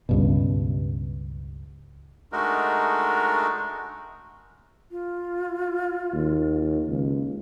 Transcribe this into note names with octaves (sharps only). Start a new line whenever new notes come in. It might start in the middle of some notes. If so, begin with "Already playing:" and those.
C#2 G2 B2
G#3 A3 D4 D#4 F#4 A#4
F4
D#2
C#2